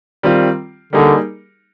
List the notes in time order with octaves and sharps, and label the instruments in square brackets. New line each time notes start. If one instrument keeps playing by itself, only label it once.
[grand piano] D#3 G3 C4 F4
[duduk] D3 [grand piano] G3 A#3 D#4 G#4